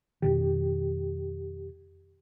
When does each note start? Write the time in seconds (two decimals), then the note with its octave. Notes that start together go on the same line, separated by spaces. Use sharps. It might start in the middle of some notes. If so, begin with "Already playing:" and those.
0.22 F2 B2 D#3 G4